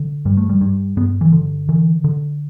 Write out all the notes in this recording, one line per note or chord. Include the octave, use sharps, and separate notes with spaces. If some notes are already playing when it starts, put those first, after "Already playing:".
Already playing: D3
G2 G3
A3
G3
G2
G2 B3
E3
D3
D3 E3
D3